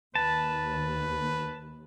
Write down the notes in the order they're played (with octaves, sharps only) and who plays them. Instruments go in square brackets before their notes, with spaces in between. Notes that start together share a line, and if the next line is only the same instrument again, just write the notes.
[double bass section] D#2 [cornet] B4 [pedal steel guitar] A5